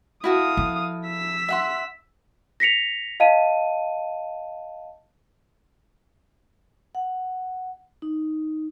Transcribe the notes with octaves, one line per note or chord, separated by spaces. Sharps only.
E4 F#4 A4 F5 D#6
F3
E6 B6
E5 F#5 C6
A#6 B6 C#7 F7
D#5 F5 A5 D#7
F#5
D#4